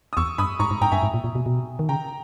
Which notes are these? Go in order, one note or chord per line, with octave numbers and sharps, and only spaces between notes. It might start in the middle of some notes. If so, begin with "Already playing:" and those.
D#6
E2 C#6 E6
G2 B5 D#6
G#2 A#5 C#6
G#2
G#2 G5 A#5
G2 E5 G#5
G#2
A#2
A#2
B2
B2
D#3
C#3 G5 A#5